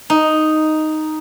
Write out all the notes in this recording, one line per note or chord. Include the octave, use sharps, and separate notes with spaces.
D#4